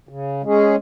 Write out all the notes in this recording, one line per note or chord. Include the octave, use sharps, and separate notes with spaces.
C#3
G#3 C#4 G#4